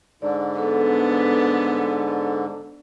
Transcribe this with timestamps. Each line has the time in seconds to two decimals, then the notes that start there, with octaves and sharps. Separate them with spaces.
0.22 G#2 D3 D5
0.58 B3 D4 A4